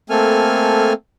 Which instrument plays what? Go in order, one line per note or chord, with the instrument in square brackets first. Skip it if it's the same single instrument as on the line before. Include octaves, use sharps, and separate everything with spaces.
[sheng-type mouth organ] A3 A#3 C4 A4 G#5 F6